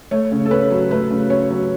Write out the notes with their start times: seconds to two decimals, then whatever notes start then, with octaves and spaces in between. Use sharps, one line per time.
0.11 A3 C#5
0.32 C#3
0.45 A4
0.51 C#4 B4
0.70 F#3
0.91 A3 B4
1.11 C#3
1.30 C#4 C#5
1.50 F#3